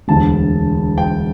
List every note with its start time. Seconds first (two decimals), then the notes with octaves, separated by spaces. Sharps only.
0.08 E1 D2 D3 G3 A5
0.98 G5